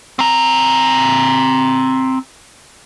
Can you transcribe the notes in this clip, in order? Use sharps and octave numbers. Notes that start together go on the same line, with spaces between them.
C4 A#5